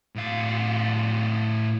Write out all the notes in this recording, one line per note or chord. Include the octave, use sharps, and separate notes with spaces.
A2 F5